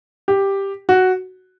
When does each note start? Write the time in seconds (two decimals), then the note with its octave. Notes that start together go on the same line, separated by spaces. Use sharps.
0.28 G4
0.89 F#4